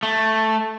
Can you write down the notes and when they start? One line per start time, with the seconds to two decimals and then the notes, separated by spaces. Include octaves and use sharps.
0.03 A3